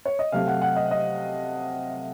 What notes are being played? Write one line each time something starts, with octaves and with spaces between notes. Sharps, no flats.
C#5
D#5
C3 F#3 A3 F5
F#5
F#5
D#5
D#5